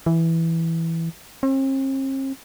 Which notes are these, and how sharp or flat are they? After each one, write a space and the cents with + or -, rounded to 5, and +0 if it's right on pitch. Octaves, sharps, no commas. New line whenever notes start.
E3 +0
C4 +45